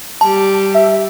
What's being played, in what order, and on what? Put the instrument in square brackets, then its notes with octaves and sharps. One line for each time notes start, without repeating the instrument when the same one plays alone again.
[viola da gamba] G3 G4 [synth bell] A5
[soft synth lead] E5